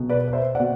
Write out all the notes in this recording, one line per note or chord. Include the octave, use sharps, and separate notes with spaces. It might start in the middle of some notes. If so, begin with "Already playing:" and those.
Already playing: B1 B2
B4 D5
D5
C5 E5
B2 D5 F#5